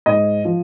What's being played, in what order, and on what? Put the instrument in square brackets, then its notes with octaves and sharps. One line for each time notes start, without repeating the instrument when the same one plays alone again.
[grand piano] G#2 D#5
F3